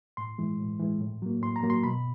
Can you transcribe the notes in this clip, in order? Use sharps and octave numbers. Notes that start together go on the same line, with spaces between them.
A2 C6
E3 G#3
A2
E3 G#3
A2
F#3 A#3
A2 C6
A#5
F#3 A#3
C6
B2 B5